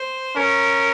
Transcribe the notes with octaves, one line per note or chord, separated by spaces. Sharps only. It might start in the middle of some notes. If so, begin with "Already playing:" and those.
Already playing: C5
C#4 A#4